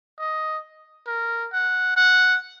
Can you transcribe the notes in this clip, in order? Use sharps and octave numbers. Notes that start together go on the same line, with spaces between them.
D#5
A#4
F#5
F#5